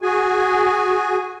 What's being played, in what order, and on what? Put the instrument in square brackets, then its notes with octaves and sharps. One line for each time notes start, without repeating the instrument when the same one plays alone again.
[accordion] F#4 G#4 G#5